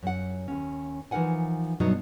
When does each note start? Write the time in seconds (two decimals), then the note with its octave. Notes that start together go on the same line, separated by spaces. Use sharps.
0.03 F#2 F#5
0.48 D#2 C#4
1.11 E3 F3 D#4 A#4 F#5 G#5
1.80 G2 B2 F#3 A3 D#4